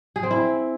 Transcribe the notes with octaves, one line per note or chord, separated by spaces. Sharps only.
G#4
C4
E4